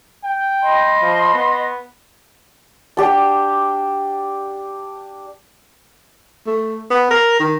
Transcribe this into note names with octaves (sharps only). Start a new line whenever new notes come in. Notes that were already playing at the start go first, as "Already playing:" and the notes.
G5
D#5 B5 C6
F3
B3
D4 G4 A5
A3
B3
A#4
D#3